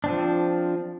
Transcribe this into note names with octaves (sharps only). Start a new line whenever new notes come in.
F3 C4 D4